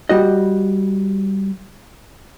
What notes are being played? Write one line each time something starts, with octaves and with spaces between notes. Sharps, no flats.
G3 F#4 D#5